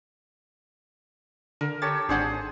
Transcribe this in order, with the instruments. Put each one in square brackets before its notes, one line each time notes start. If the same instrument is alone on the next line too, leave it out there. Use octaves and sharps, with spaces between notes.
[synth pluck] D3 [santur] A#4
[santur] G4 A4 C#5 [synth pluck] A6
[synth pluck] G#1 D4 F#5 [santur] G#4 C5